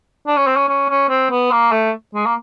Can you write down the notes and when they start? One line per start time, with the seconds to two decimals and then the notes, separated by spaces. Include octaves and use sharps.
0.27 D4
0.37 C#4
0.47 C4
0.57 C#4
0.68 C#4
0.89 C#4
1.09 C4
1.31 B3
1.51 A#3
1.72 A3
2.14 G#3
2.26 A#3